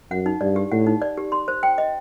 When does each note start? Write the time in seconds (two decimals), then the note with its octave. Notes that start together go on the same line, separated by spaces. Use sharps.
0.11 F#2 F#5
0.26 D#4
0.41 G2 D5
0.56 G4
0.72 A2 F#5
0.87 D#4
1.02 D5
1.17 G4
1.32 C6
1.48 C5
1.63 G5
1.78 D#5